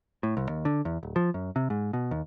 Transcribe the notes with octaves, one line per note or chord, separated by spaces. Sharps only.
A2
C2
D#2
D3
E2
D1
F3
F#2
C3
G#2
B2
D#2